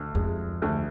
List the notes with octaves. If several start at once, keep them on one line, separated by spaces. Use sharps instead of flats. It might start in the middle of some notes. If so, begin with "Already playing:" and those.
Already playing: D2
F2 G#3
D2